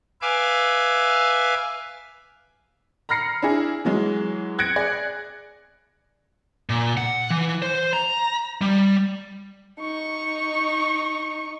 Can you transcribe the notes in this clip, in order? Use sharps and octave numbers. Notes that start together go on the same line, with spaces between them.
B4 E5 F5 G#5 D6
A#5 B5 F6 A#6 C7 C#7
D4 E4 G#4
E3 F#3 G#3
F#6 G#6 A#6 C#7 D7
G#4 D5
A#2
F#5
E3
C5
A#5
G3
D#4 C#6